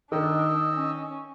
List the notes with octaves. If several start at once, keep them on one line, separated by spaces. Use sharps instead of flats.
D#3 D4 D#5 E6
C#4